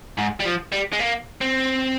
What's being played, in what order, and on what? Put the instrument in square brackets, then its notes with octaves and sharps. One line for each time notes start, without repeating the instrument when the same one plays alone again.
[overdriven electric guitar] G#2
G3
F3
G3
G#3
A#3
C4